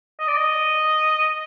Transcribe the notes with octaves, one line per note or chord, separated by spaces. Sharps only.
D#5
D5
D#5